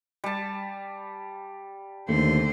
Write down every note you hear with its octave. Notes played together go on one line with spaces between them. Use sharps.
G3 A5
D#2 D3 A3 C5